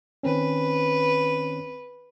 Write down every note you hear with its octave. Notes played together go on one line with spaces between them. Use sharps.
D#3 C4 C#4 B4